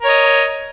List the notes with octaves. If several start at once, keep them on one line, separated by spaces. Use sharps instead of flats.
A#4 C#5 D#5